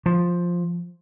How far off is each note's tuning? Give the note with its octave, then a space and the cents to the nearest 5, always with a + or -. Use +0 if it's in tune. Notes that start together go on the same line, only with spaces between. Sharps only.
F3 +5